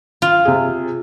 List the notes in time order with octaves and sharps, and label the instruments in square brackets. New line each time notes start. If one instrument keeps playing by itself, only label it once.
[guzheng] F4
[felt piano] C3 G#4